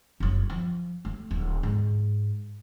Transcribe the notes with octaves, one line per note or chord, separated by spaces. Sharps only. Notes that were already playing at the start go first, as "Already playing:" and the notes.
F#1 F#3
F3
A3
D1
G#2